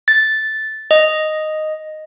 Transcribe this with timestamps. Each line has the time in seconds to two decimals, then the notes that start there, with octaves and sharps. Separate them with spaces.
0.08 A6
0.91 D#5